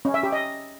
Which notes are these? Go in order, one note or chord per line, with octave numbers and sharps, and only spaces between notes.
C#4
E5
G4
D#5